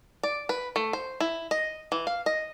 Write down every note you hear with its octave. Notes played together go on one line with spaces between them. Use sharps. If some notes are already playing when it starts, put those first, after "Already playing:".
D5
B4
A3
C5
E4
D#5
E3
F5
D#5